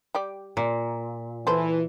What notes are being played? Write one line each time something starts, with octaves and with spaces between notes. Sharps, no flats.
G3 G4 D5
A#2
E3 A4 B4 C5